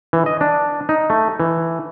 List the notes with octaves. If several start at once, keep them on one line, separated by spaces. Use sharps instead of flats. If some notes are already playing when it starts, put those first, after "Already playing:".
E3
D#5
D4
D#4
A3
E3